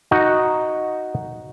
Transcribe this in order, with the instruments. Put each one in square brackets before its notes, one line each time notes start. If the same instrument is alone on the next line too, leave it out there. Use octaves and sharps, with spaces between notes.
[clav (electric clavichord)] D#4 F#4